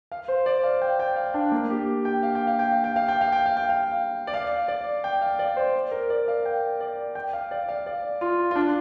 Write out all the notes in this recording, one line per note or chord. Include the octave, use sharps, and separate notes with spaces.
F5
C5
D5
F5
G5
G5
F5
D4
A#3
G4
G5
F5
G5
F5
G5
F5
G5
F5
G5
F5
G5
F5
G5
F5
D5
F5
D5
G5
F5
D5
C5
A#4
D5
F5
G5
D5
G5
F5
D5
F5
D5
F4
F4
D4